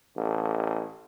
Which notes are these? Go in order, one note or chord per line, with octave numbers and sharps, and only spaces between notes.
A1